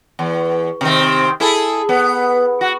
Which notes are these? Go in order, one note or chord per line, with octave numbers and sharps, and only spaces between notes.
E2
C3 D#3 C4
E4 G#4 A4
B3
F#4